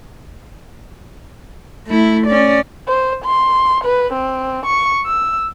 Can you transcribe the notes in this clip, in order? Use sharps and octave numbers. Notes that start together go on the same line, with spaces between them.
A3 E4
C#4 D5
C5
C6
B4
C4
C#6
E6